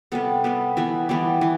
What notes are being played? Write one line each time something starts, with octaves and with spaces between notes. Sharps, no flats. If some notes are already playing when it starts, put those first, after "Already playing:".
C3 G3 B3 A4
C3 G3 B3
E3 G3 B3 E5
E3 G3 B3 D5
E3